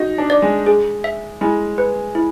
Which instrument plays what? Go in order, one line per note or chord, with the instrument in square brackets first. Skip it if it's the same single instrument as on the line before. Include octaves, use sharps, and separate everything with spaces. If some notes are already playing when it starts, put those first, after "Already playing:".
Already playing: [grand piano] D#4 [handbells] F#4
[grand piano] D4
[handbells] D5
[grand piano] G#3
[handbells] G#4
E5
[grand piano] G#3 [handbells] E4
[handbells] B4
E4